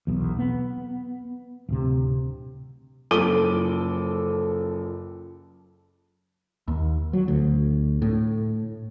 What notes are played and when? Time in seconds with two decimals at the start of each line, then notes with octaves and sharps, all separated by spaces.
0.07 B1 E2
0.39 B3
1.69 D1 C3
3.11 F#1 F3 A4 D6 D#7 G7
6.68 D#2
7.13 F#3
7.28 D2
8.02 A2